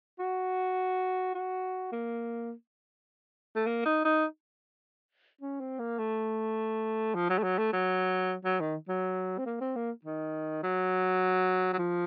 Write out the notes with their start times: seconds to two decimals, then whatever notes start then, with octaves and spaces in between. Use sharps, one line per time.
0.19 F#4
1.35 F#4
1.92 A#3
3.56 A3
3.66 A#3
3.85 D#4
4.05 D#4
5.41 C#4
5.60 C4
5.79 A#3
5.99 A3
7.15 F3
7.30 F#3
7.39 A3
7.43 F#3
7.58 A3
7.73 F#3
8.45 F#3
8.60 D#3
8.88 F#3
9.38 C4
9.46 A#3
9.61 C4
9.76 A#3
10.05 D#3
10.63 F#3
11.73 F#3
11.78 F3